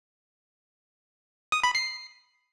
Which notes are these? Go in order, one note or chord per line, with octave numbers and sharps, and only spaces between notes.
D#6
B5
C7